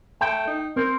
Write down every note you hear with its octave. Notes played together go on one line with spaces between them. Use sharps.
A3 G5
D#4
C4 A#4